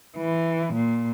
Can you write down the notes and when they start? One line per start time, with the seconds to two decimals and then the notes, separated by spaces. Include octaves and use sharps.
0.17 E3
0.73 A#2